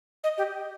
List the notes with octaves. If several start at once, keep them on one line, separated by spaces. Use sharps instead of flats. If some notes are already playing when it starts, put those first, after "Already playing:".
D#5
G4